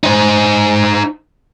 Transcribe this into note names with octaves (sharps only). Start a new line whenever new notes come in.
D#4 C5